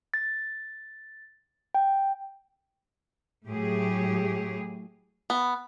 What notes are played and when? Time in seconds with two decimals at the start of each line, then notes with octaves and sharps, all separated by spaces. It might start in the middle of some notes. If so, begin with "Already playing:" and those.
0.14 A6
1.75 G5
3.46 A2 F#3 A3 G4 G#4
5.30 B3